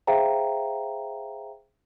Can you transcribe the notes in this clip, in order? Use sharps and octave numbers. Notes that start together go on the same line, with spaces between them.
G#4 C5 E5 F5 G5 A#5